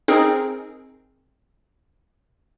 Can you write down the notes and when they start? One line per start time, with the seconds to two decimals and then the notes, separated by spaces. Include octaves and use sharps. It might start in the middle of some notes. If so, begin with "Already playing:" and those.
0.08 C4 D#4 G#4 A#4